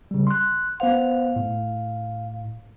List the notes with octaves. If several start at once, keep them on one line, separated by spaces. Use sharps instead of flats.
C#3 G3
C6 F#6
B3 C5 F5 F#5
A2